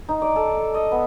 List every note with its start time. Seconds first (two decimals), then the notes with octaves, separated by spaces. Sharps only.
0.09 D#4
0.22 D5
0.36 A4
0.74 D#5
0.92 B3